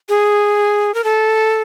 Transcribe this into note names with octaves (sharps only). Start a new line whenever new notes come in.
G#4
A#4
A4